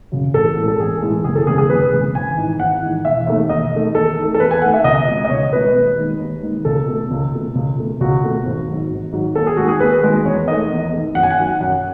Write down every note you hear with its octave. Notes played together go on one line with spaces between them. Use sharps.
F#2 C#3
A1 A4
A2 E3 G#3
A4
A1 G#4
A2 E3 G#3
F#1 G#4
A4
E2 C#3 G#3 G#4
G#4
F#1 B4
E2 C#3 G#3
G#1 G#5
G#2 E3
G#1 F#5
G#2 E3
E1 E5
D#2 D#3 A3
E1 D#5
D#2 D#3 A3
E2 A4
D#3 A3
A4
E2 B4
G#5
D#3 A3 F#5
E5
C#2 D#5
B2 G#3
D#5
C#2 C#5
B2 G#3 B4
D#2
D#3 G#3
D#2
D#3 G#3
C#2 A4
B2 A3
C#2
B2 A3
C#2
B2 A3
C#2 F#4
B2 A3
G#1
G#2 F#3
G#1
G#2 F#3
D#2 A4
G#4
D#3 G#3 F#4
G#4
D#2 B4
D#3 G#3
E2 C#5
D#3 A3 D#5
E2
D#3 A3
F#2 F#5
G#5
F#5
D#3 F#3
F#2 F#5